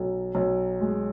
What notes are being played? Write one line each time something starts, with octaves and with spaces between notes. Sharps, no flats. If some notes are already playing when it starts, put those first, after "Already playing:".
Already playing: B1
B1
G#3